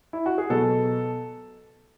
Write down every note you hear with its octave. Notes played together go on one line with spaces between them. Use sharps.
E4
F#4
G#4
B2 F#3 A4